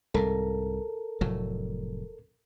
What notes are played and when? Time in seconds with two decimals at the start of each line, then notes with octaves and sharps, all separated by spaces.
0.14 C2 G#2 A4 A#4
1.21 F1 A2 F#3